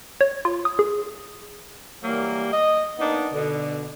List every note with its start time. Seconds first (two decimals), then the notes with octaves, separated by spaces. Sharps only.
0.21 C#5
0.45 F4
0.65 D#6
0.79 G#4
2.03 E3 F#3 G3 A#3
2.53 D#5
2.99 A#3 B3 D4 D#4
3.34 B2 D3